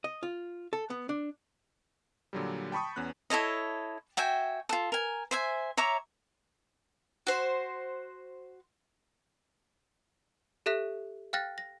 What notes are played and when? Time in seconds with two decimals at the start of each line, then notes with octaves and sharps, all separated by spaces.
0.04 D#5
0.23 F4
0.73 A4
0.90 B3
1.09 D4
2.33 A#2 D3 F#3 G3
2.72 G5 A5 B5 C#6 D#6
2.96 E2 B3 C#4 F#6
3.30 E4 A4 C#5 D#5
4.17 F#4 E5 G5 G#5
4.69 F4 A4
4.92 A#4 G#5
5.31 C5 E5 G#5
5.77 C#5 E5 A#5 D6
7.27 F#4 C5
10.66 G4 A4 E5 F#6 B6
11.33 F5 G5 F6 F#6 A6 A#6
11.58 A#6